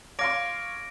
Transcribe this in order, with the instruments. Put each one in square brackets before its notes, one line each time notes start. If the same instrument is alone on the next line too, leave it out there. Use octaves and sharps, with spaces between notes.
[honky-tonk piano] C#5 F5 C6 [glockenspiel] D6 A#6 D7